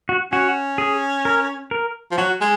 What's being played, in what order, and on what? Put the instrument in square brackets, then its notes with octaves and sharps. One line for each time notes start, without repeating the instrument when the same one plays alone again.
[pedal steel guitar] F#4
[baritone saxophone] C#4 [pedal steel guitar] F#4
[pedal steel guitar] G#4
A#4
A#4
[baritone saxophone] F3
[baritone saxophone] F#3 [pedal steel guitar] F#4
[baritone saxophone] G#3